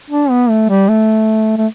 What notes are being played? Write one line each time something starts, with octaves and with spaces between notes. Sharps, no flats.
D4
B3
A3
G3
A3
A3